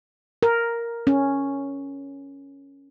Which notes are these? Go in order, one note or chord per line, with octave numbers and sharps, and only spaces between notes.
A#4
C#4